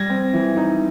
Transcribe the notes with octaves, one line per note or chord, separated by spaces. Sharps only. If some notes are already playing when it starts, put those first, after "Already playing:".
Already playing: G3 G#6 A#6
C4
E3
D#4